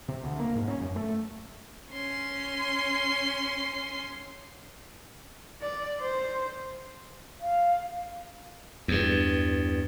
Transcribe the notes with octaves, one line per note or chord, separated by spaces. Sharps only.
C3
D2
A#3
G#2
C#4
F#2
A3
C#4 C6
D5
C5
F5
E2 G2